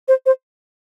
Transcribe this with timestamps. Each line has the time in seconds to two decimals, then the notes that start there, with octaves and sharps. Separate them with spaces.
0.08 C5
0.26 C5